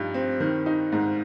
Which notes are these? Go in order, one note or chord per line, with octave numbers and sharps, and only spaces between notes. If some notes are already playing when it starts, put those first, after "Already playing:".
Already playing: G2 F3 D#4
C4
D#3
D#4
G#2